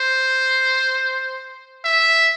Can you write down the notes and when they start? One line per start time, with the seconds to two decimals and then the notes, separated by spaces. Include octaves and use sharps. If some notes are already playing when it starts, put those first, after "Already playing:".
Already playing: C5
1.84 E5